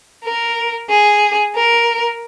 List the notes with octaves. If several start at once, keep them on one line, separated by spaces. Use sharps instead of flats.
A#4
G#4
A#4